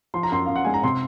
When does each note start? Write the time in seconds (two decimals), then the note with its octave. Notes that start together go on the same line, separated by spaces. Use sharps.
0.14 F3 C6
0.23 A#5
0.32 F#2 C6
0.46 F#2 F5
0.56 F#5
0.65 G#3 G#5
0.74 A#5
0.83 C3 C6